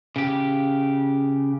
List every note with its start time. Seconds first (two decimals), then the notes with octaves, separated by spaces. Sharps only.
0.16 C#3 G4